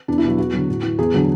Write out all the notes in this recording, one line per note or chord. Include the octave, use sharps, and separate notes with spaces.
E2 D4
E4
B2 F#3 F#4
E2 F#4
D3 F#3
A2
E3
E2 G#4
D3 F#3